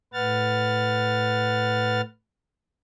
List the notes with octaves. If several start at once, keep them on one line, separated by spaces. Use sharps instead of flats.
A2 B4 F#5 F6 A6